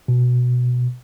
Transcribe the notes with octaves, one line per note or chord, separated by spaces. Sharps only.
B2